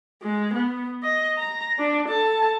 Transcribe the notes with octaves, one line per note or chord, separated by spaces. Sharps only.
G#3
B3
D#5
A#5
D4
A4 A5